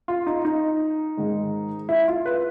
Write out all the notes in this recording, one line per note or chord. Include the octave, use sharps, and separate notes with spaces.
F4
D#4
D#4
G#2 D#3 G#3
E4
F4
B4